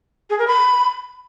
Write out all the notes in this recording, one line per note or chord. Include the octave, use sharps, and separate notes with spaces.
G#4
A#4
B5